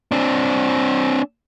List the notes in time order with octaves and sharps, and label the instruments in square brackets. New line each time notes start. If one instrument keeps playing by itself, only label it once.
[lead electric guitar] C4 D4